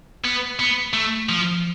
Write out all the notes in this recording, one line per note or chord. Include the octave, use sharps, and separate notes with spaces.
B3
B3
A3
F3